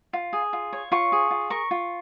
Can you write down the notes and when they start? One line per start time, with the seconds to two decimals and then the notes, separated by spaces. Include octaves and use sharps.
0.13 F4
0.33 G#4
0.53 F4
0.73 C#5
0.92 F4 C#6
1.12 G#4
1.31 F4
1.50 A#4 C#6
1.71 F4